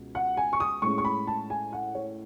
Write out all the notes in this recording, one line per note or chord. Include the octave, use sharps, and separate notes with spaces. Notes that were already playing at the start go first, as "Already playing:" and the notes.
Already playing: C#2 B2
F#5
G#5
C#6
D#6
A2 G#3 C#4 C#6
C#6
B5
A5
G#5
F#5
C#5